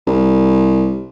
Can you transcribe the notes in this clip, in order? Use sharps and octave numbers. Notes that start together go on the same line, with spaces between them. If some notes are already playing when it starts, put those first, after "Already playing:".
C2